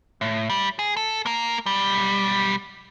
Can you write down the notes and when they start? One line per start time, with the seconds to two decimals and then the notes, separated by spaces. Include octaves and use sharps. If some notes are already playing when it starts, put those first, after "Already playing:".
0.21 A2
0.50 G3
0.79 G#4
0.97 A4
1.26 A#3 A#4
1.66 B1 G3